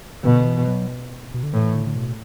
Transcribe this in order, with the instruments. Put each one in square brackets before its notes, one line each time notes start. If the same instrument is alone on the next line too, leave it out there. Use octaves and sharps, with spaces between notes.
[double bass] B2 [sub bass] D3
[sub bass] E3
F#3
B2
D3
[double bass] A2 [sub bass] E3
[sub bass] D3
D3
B2